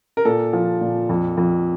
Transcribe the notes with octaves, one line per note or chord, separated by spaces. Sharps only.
A#4
A#2 A4
F3
A#2
F2
F2